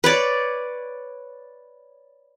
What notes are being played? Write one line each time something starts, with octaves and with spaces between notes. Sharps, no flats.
B4 C#5 D5